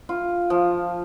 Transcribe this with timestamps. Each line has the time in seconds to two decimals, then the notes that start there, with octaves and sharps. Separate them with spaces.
0.09 F4
0.50 F3